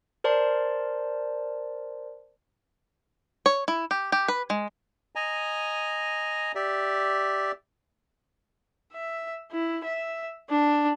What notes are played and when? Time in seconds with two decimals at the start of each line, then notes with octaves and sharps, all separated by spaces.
0.24 A#4 C5 D5 A5 C6
3.46 C#5
3.68 E4
3.91 G4
4.12 G4
4.28 B4
4.50 G#3
5.16 D#5 G#5 A#5
6.55 G4 D5 E5
8.92 E5
9.51 E4
9.84 E5
10.50 D4